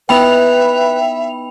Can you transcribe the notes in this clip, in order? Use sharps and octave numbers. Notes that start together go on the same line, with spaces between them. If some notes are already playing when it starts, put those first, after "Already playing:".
B3 D#4 E4 B4 E5 G5 B5 F7